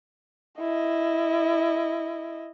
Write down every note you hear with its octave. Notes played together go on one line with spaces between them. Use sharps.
E4 D#5